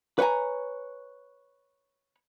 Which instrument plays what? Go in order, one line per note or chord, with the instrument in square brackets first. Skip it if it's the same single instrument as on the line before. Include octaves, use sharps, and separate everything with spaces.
[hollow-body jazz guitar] B4 C#5 F#5 G#5 A#5